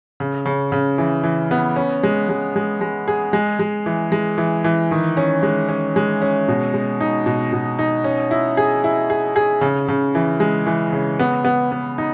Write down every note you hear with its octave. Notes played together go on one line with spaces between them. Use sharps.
C#3
C#3
C#3
E3
E3
B3
C#4
G#3
G#3
G#3
G#3
G#4
G#3
G#3
E3
G#3
E3
E3
D#3
C#4
G#3
C#4
G#3
C#4
B2
G#3
D#4
B2
B2
D#4
C#4
E4
G#4
E4
G#4
G#4
C#3
C#3
E3
G#3
E3
C#3
B3
B3
B3
D#4